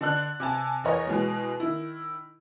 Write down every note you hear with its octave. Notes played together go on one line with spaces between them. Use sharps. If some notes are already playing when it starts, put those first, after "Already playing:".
D3 D4 F#6
C3 G#5 A5
E2 A#4 C#5 D#5
B2 E3 G#3
D#3 E4